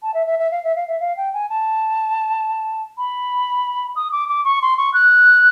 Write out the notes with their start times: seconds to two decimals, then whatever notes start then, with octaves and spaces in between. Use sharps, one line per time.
0.03 A5
0.14 E5
0.27 E5
0.39 E5
0.51 F5
0.64 E5
0.76 F5
0.88 E5
1.00 F5
1.17 G5
1.34 G#5
1.50 A5
2.98 B5
3.96 D#6
4.12 D6
4.29 D6
4.45 C#6
4.62 C6
4.78 C#6
4.94 F#6